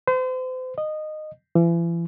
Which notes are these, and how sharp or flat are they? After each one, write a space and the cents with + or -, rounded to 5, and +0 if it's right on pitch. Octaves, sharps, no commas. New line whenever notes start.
C5 -40
D#5 -15
E3 +40